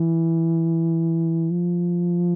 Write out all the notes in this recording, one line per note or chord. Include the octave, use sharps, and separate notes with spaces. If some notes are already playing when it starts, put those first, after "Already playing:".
Already playing: E3
F3